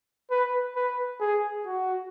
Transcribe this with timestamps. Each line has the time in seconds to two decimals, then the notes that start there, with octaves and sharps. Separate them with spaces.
0.31 B4
0.76 B4
1.21 G#4
1.66 F#4